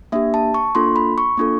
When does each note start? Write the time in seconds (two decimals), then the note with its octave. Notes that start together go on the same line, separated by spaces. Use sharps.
0.12 A#3 D4 G4 E5
0.34 A5
0.54 C#6
0.75 A#3 D4 F4 A4 C6
0.96 B5
1.18 C#6
1.37 A#3 D4 F4 A4